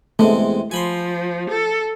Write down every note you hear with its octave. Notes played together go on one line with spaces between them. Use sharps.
E2 C3 G#3 A3
F3 G#5 B5 C6
A4